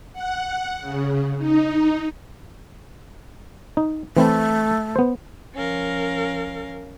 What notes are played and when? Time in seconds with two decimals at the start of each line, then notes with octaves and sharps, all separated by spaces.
0.13 F#5
0.80 C#3
1.38 D#4
3.77 D#4
4.17 E3 A3 C4 E4
4.96 B3 C5
5.54 F3 C#4 A#4 F5